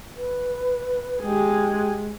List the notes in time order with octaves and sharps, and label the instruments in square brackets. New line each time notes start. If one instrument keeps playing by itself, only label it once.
[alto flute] B4
[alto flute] G#3 [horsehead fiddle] G4 G#4